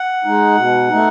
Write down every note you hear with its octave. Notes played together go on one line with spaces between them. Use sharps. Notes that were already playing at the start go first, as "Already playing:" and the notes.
Already playing: F#5
G#3 D#4
B2
A3 D#4